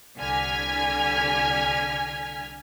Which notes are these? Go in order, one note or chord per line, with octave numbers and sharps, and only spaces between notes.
C2 D3 G#5 F6 G#6 B6